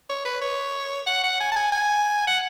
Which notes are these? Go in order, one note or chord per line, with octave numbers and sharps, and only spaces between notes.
C#5
B4
C#5
F#5
F#5
G#5
A5
G#5
G#5
F#5